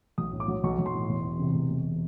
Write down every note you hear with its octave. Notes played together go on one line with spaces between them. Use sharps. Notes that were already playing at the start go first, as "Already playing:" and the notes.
B1 D#6
A2
D6
F#3
B1 C#6
B1
C6
A2
E1
E2
C3
E1
E1